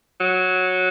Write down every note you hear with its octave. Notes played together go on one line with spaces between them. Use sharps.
F#3